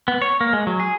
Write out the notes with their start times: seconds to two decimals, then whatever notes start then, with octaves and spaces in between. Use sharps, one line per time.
0.08 B3
0.22 C#5
0.41 A#3
0.53 G#3
0.67 F#3
0.80 G#4